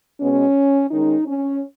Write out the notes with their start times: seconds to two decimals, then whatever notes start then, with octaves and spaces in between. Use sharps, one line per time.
0.19 B2 G#3 B3 C#4
0.91 D#3 G#3 C#4 D#4
1.26 C#4